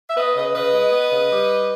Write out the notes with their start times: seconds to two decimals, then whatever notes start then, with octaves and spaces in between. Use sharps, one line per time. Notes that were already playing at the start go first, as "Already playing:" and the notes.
0.10 E5
0.16 B3 B4 D#5
0.35 C#3 B4 D#5
0.54 C#3 B4 D#5
0.74 G#3
0.92 B3
1.12 C#3
1.31 G3